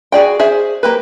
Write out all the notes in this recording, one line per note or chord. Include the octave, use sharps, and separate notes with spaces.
F#4 G#4 D5 G5
G#4 C5 E5
A#3 G4 B4